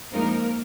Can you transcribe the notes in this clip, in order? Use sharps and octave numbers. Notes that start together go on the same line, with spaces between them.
F2 F3 G#3 A#3 C4 D#4 A#4